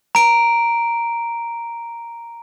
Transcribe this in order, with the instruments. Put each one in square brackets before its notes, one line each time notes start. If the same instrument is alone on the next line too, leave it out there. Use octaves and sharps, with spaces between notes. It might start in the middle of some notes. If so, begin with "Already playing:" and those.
[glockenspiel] A#5 D7